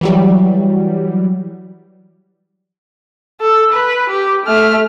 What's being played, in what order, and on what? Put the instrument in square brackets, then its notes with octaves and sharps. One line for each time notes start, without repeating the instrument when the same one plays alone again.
[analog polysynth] E3 F#3 G3
[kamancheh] A4
B4
G4
A3 F6